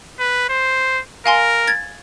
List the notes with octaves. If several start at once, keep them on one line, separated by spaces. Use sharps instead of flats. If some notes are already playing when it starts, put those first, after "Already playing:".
B4
C5
A#4 F5 G#5 C6
G#6 A6